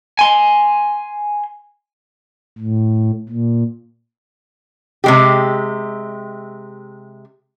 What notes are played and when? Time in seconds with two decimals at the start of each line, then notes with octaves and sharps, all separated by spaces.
0.19 G#5 C6
2.59 A2
3.29 A#2
5.04 C3 G#3 G4